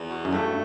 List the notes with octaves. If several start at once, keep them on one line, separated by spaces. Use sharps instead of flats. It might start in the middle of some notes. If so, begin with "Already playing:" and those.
Already playing: E2
B2
F#2
G2 A3